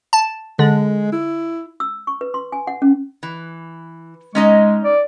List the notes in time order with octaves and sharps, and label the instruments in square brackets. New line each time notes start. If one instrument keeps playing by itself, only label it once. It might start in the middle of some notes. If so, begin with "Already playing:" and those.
[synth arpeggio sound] A5
[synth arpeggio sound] D3 [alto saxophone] G#3
[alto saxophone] E4
[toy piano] E6
C#6
B4
C6
G#5
F#5
C#4
[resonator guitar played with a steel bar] E3
[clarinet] G#3 [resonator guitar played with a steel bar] C#4 D#4 D#5
[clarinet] D5